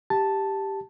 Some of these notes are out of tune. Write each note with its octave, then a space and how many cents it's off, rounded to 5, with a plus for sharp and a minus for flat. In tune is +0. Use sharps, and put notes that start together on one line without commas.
G4 +0 A5 +0